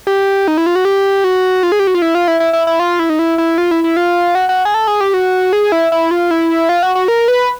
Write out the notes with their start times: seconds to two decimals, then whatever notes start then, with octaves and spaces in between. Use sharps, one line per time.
0.07 G4
0.48 D#4
0.58 E4
0.66 F4
0.75 F#4
0.85 G4
1.24 F#4
1.63 F4
1.72 G#4
1.79 G4
1.87 F#4
1.95 F4
2.02 E4
2.15 F4
2.28 E4
2.40 E4
2.53 E4
2.67 E4
2.80 F4
2.99 E4
3.10 D#4
3.19 E4
3.38 E4
3.58 F4
3.71 E4
3.84 E4
3.97 F4
4.35 F#4
4.49 F#4
4.65 G#4
4.74 A4
4.87 G#4
5.01 G4
5.14 F#4
5.53 G#4
5.72 E4
5.92 E4
6.11 F4
6.31 E4
6.69 F4
6.83 F#4
6.95 F#4
7.08 A#4
7.28 B4